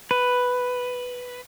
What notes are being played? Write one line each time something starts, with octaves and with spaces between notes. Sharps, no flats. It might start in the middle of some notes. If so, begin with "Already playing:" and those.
B4